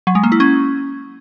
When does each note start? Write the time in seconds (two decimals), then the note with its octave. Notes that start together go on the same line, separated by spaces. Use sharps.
0.07 F#3
0.15 G#3
0.23 A#3
0.32 E4
0.40 C#4